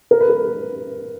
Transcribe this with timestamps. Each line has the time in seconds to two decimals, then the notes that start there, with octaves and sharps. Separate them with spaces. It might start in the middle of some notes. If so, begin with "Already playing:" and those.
0.11 A#4
0.21 B4
0.30 A#4